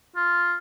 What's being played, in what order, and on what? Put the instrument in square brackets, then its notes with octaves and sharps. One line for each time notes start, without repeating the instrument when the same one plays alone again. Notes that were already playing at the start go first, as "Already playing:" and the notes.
[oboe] F4